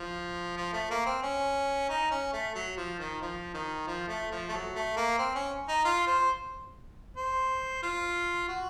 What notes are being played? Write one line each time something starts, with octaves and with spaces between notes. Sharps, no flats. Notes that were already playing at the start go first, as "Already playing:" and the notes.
Already playing: F3
F3
A3
A#3
C4
C#4
D#4
C#4
A3
F#3
F3
D#3
F3
D#3
F3
A3
F3
A3
F#3
A3
A#3
C4
C#4
D#4
F4
C5
C5
F4
F#4